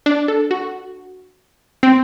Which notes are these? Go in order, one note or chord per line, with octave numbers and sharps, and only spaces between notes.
D4
A4
F#4
C4